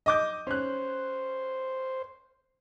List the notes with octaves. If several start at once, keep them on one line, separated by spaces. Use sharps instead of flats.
D#5 D6 G6
C#4 C5 F#6